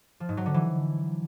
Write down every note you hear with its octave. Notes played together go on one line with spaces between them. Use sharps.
F3
G#2
F#3
D3
E3